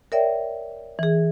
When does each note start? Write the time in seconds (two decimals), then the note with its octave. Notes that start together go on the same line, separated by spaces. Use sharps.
0.12 A#4 C#5 D5 E5 G5
0.99 E3 G#4